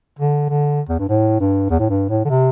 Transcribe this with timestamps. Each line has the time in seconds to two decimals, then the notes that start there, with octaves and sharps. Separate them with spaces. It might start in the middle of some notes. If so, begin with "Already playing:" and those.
0.19 D3
0.49 D3
0.89 E2
0.99 G2
1.09 A2
1.40 G2
1.70 E2
1.79 A2
1.90 G2
2.09 A2
2.25 D3
2.30 C3